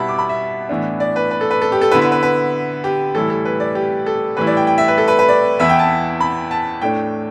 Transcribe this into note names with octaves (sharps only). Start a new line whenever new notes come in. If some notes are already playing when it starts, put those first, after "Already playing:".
Already playing: B2 G3 B3 E4 E5 A5 B5
D6
B5
E5
A2 E3 B3 D4
D5
B4
B4
A4
B4
A4
G4
A4
D3 B3 E4 B4
B4
B4
B4
G4
A2 E3 G3 E4 A4
A4
B4
D5
G4
A4
A2 E3 G3 E4 B4
D5
G5
G5
E5
B4
A4
B4
B4
D5
E2 E3 B3 E4 E5
G5
A5
B5
A5
A2 A3 D4 G5